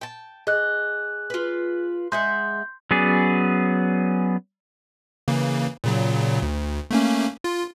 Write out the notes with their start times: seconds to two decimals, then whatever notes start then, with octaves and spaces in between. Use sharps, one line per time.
0.01 G5 A5
0.47 G#4 D#5 F#6
1.30 F4 B4
2.12 G#3 E5 F#5 C6 G6
2.91 F#3 B3 C#4 G#4 D5
5.28 C#3 E3 A#3
5.84 A#2 C#3 F#3
6.42 D2
6.91 A3 A#3 C#4
7.44 F4